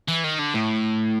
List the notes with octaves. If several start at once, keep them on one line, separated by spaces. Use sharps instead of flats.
E3
D#3
D3
A2